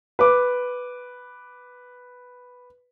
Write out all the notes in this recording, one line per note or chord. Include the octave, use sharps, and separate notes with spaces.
B4 D6